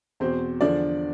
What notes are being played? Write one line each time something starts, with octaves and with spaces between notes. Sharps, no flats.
E2 B2 C4 C5
E2 D3 F3 D4 D5